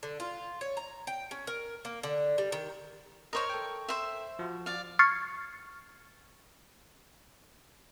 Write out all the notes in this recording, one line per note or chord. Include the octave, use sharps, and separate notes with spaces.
D3
F4
C#5
A#5
G5
C#4
A#4
A#3
D3
G3
D#3
A#4 C5 C#5 D#5 C#6
A4 G5
C5 E5
F3 F#4
D5 F5
C#6 F6 G#6 A6 C7 C#7